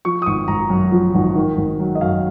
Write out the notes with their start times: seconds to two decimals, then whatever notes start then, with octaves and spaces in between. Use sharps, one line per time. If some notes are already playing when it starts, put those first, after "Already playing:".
0.05 F3 C#6
0.22 D#6
0.26 G#1 C#6
0.48 G#1 A#5
0.70 F#2
0.92 F3
1.14 G#1
1.35 D#3
1.57 G#1
1.80 F#3
1.95 D#5
2.01 F#2 F5